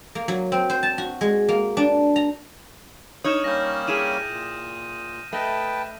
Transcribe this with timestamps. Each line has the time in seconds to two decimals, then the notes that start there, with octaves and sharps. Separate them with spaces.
0.15 A#3
0.28 F#3
0.52 C4
0.70 C5
0.83 A5
0.98 F#4
1.21 G#3
1.49 A#3
1.77 D4
2.16 A#5
3.24 D#4 C#5 D#6 F6 E7
3.44 G3 A#3 C#4 G6 A#6
3.88 E4 G4 G#4 D#6 D#7 E7
4.27 A#2
5.33 A3 B4 D#5 G5 A5